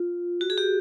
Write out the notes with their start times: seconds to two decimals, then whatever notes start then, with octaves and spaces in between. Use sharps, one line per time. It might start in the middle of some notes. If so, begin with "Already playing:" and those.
Already playing: F4
0.41 F#4
0.50 G#4
0.58 G4